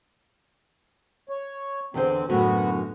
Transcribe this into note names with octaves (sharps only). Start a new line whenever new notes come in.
C#5
E2 D3 C4 C5
F#2 A2 D3 B3 F#4